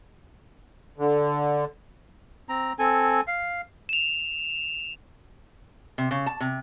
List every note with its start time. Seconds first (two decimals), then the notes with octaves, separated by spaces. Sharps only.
0.98 D3
2.49 C4 A#5
2.79 C4 A4 G#5
3.27 F5
3.89 E7 F7
5.98 C3
6.11 C#3
6.26 A5
6.41 C3